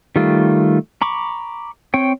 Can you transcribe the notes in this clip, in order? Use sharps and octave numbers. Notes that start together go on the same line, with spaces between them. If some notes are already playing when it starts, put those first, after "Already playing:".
D#3 G3 A3 F4
A#5 B5 C#6 D6
C4 C#5 G5